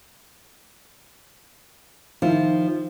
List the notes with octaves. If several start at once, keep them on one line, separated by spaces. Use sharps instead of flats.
D#3 F3 E4